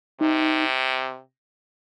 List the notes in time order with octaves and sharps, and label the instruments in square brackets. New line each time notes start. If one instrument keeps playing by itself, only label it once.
[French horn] C3 [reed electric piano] D#4